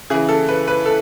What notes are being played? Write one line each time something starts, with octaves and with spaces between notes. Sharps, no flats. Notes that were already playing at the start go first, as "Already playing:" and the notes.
C#3 E3 G#4
A4
B4
B4
A4